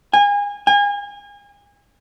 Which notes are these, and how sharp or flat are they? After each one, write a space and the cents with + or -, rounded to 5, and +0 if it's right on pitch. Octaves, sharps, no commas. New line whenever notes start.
G#5 -30
G#5 -35